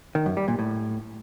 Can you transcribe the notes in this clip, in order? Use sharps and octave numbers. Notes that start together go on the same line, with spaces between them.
D#3
F#2
G3
A#2
A2